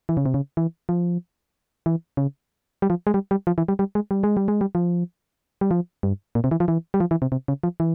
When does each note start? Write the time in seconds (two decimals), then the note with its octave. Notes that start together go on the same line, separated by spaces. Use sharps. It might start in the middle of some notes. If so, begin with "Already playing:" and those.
0.09 E3
0.17 C#3
0.26 C3
0.34 C#3
0.57 E3
0.89 F3
1.86 E3
2.17 C#3
2.82 G3
2.90 F3
3.07 G#3
3.14 G3
3.31 G3
3.47 F3
3.58 E3
3.68 G3
3.79 G3
3.95 G#3
4.11 G3
4.24 G#3
4.37 G3
4.48 G#3
4.61 G3
4.75 F3
5.61 G3
5.71 F3
6.03 G2
6.35 A#2
6.44 C3
6.51 E3
6.60 F3
6.68 E3
6.94 G3
7.00 F3
7.11 E3
7.22 C3
7.32 C3
7.48 C#3
7.63 F3
7.80 E3